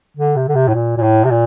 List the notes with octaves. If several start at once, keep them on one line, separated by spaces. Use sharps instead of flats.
D3
C3
D3
C3
A2
A#2
A#2
A2
C3
A#2